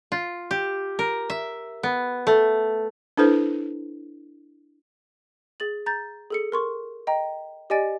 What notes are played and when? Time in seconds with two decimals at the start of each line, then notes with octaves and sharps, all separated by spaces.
0.12 F4
0.51 G4
0.99 A#4
1.30 E5
1.83 B3
2.27 A3
3.17 D4 E4 A4 B4 C5
5.60 G#4 A6 F#7
5.86 A#5 G6 A6
6.30 G#4 A4 C#7
6.52 A#4 C6 C#6
7.07 D#5 G5 A#5
7.70 G4 D5 D#5 G#5 A6 D7